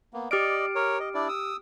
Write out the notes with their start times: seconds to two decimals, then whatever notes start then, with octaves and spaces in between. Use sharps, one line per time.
0.13 A#3 B3
0.31 G4 D5 D#5 F6 D7
0.75 A#4 C#5
1.00 D#5
1.14 D4 E4 D5
1.28 D#6 E6